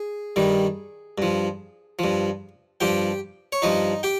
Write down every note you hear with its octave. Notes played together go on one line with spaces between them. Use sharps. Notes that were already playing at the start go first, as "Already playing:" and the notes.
Already playing: G#4
G2 D#3 G3
G2 F3
G2 F3
G2 F3 G4 G5
C#5
G2 F3 D#4 D#5
G4 G5